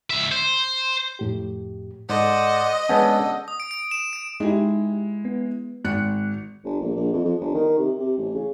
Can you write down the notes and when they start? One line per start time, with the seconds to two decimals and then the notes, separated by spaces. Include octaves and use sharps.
0.10 C#2 E5
0.31 C5
1.19 F2 A2 G4
2.09 G#2 A4 C5 D5 D#5 F#5
2.89 G#3 B3 C#4 D4 A4 F#5 G6
3.48 D#6
3.60 D7
3.71 D7
3.91 E7
4.13 D7
4.40 G#3 D#4 E4 G4
5.25 B3
5.84 G#1 F#6 C#7
6.65 G1
6.81 A#1
6.96 A#1
7.13 F2
7.25 F2
7.41 G1
7.54 D#3
7.78 C3
8.00 C3
8.18 A1
8.34 C#3